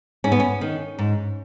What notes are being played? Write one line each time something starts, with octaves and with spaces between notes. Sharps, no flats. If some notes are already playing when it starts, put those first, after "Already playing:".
G#2 C#4
B3
C#4
D#3
G#2